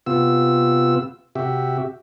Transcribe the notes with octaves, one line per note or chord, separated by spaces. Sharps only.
C3 B3 F4 E6
C3 F#4 G4 E5